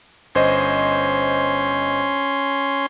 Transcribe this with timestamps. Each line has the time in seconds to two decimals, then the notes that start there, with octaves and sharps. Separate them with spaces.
0.35 G1 C#4 C5 D#5 C6